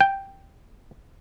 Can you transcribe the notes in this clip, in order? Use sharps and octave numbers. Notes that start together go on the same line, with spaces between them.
G5